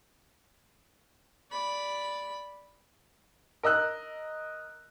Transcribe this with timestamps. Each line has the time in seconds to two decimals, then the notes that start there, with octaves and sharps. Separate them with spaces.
1.51 D5 B5
3.63 A#4 D#5 E6 F#6